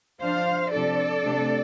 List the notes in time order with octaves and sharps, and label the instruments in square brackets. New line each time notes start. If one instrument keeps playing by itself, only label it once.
[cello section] F3 D4 C5 F5
C3 F3 D4 A4 D5
C3 A3 D4